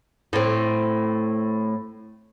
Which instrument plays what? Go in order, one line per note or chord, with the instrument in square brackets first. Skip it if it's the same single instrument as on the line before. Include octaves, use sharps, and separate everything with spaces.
[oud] A2 C4